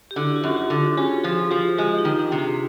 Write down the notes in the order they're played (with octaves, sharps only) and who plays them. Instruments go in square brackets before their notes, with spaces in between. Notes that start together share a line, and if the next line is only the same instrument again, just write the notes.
[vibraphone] G4
[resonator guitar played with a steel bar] D3 [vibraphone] E4 F#4
[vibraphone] F4
[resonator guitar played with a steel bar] F#2 [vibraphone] F#4
[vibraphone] F4 G4
[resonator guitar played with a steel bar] D3
[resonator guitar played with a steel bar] C#4 [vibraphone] F#4 G#4
[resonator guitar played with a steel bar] F3 [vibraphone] F#4 G#4
[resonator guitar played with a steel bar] F3 [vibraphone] F4 G4
[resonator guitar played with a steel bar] G#3 [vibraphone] F4 G4
[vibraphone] D#4
[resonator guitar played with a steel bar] D#3
[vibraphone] D4
[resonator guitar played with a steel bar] C3
[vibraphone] F#4 G#4